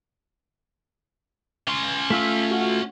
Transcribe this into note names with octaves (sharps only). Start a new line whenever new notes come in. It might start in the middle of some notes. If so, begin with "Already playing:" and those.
C#4 C6
A3 F4 E6 B6
F#4